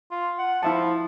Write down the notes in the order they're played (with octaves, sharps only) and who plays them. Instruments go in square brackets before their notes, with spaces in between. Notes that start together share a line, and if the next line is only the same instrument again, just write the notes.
[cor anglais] F4
F#5
[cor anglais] F3 [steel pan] E4 E5 A5